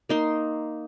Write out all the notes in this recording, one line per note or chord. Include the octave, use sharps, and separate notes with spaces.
A#3 D#4 C6